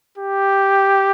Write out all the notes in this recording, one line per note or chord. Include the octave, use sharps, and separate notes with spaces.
G4